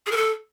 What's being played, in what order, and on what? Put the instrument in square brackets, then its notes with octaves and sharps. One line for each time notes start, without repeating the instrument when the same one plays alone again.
[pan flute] G#4
A#4
A4